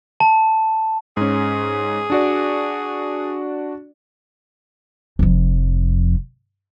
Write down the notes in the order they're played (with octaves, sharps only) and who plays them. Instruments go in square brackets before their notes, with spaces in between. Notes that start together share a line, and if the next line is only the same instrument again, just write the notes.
[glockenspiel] A5
[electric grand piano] G#2 C#4 [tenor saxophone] G#4
[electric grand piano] D4 F#4 D5
[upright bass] F1 F2